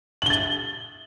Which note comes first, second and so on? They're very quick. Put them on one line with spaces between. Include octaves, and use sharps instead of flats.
F#7 G7 A6